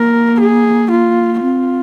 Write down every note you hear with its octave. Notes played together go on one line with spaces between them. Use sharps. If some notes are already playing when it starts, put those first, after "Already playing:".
Already playing: A#3 A#4
G#4
F4
C4 F4